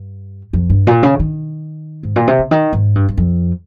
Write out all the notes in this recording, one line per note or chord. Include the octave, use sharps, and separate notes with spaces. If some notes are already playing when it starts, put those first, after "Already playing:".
Already playing: G2
F2
G2
A#2
C#3
D#3
G#2
A#2
C3
C#3
D#3
G#2
G2
G2
F2